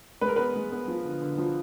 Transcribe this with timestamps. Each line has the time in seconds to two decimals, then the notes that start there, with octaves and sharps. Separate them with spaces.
0.21 G#3 B4
0.28 A#4
0.36 B3 B4
0.56 G#3
0.72 B3
0.88 F3
1.05 D3
1.21 D3
1.38 F3